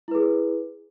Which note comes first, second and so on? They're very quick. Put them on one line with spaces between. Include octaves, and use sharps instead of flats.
E4 B4 G#4